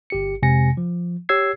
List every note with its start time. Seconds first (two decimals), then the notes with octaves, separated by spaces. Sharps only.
0.10 G1 G4 C#7
0.42 F2 C3 G#3 G#5 A#6 C#7
0.77 F3
1.29 G4 C#5 E6 G#6 C7